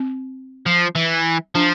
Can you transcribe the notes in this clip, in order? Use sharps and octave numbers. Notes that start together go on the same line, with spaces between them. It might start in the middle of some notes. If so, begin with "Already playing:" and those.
Already playing: C4
F3
E3
F3 D4